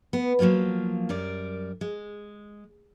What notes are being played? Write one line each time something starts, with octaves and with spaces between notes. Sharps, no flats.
B3
F3 F#3 A3 A#3 F4
F#2 G3 A#4 D5
G#3